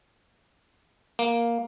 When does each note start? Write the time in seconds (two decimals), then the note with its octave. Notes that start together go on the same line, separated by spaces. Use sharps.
1.19 A#3